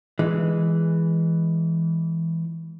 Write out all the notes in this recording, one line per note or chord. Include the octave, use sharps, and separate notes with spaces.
E3 G#3